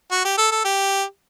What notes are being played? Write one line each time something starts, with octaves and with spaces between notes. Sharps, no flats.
F#4
G4
A4
A4
G4